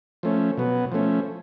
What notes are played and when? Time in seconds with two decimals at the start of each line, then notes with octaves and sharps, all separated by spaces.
0.23 F3 A3 C#4
0.57 B2 F#3 B3
0.92 F3 A3 C#4